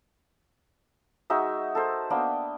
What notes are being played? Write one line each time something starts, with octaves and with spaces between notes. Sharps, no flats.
G#3 D#4 F#4 E5
A4 A#4 C5
A#3 B3 D4 G5